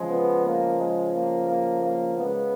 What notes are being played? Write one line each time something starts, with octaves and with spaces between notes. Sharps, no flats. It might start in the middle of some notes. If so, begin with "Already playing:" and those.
Already playing: C#3 F3 G#3
B3
A#3
G#3
A#3
A#3
A#3
C#3 G#3 B3